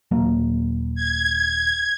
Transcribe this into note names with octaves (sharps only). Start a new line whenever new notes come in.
D#1 F#3 A#3
G#6